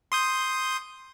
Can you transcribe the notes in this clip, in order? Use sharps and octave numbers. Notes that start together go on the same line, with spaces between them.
C6 D#6 G6